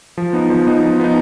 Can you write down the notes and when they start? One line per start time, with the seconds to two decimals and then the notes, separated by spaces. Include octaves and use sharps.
0.17 F3
0.33 B3 D#4
0.50 F3
0.67 B3 D#4
0.83 F3
1.00 B3 D#4